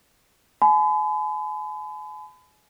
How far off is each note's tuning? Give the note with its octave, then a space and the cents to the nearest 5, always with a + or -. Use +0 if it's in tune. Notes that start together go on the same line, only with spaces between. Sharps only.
G#5 +40 B5 +35